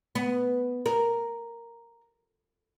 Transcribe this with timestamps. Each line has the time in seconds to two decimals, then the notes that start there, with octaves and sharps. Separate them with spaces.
0.15 B3
0.86 A#4